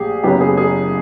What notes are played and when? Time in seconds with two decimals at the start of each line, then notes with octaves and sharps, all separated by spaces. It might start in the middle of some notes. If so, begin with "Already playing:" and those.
Already playing: A#1 G4 G#4
0.23 F#1 F#2 C#3 F#3 B3 G4
0.41 G#4
0.57 G#4